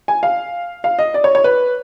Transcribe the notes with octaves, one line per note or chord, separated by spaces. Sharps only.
G#5
F5
F5
D#5
D5
C#5
C#5
B4